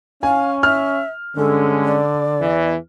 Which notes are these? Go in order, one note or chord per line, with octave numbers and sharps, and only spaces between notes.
C#4 F5 G#5
E5 F6
G2 D3 G#3 C#4 A4
D5
E2 E3